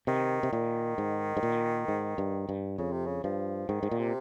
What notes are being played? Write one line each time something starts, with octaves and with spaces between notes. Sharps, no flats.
C3 D#3
C3
A#2 D#3
G#2
G#2
A#2
G#2
G2
G2
F2 C#3
C3
C#3
G2 F3
G#2 D#3
G#2
A#2
C3